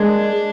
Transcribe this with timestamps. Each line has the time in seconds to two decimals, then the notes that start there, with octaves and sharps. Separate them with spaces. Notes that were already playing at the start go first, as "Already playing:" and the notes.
Already playing: G#3 D4